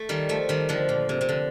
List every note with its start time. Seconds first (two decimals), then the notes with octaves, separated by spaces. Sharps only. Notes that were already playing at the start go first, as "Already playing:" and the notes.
Already playing: A3
0.09 D#3 G3
0.29 F3 A3
0.49 D#3 G3
0.69 D3 F3
0.89 A#2
1.09 C3
1.21 C3
1.29 D3